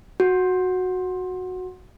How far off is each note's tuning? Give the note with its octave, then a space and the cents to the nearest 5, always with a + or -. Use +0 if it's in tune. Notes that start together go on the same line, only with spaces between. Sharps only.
F#4 -10